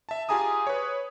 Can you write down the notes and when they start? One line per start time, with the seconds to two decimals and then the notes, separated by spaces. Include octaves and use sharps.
0.09 E5 A5
0.29 F4 G4 G#4 G#5 A#5 D#6
0.67 B4 C#5